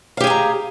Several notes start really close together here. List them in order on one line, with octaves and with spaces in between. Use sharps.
F5 G4 G#4 G#5 A#5